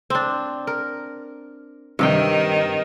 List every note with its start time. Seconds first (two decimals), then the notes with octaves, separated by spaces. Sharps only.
0.10 C4 D4
0.67 A#4
1.99 G2 C3 D#3 G5